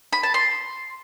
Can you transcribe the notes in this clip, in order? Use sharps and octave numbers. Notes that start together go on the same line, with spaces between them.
B5
A5
C6